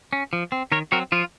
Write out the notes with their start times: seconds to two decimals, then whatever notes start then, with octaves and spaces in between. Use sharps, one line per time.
0.13 C#4
0.33 F3
0.52 C4
0.72 D#3 A#4 C#5
0.92 F#3 C4 F#4 A#4
1.12 F3 F4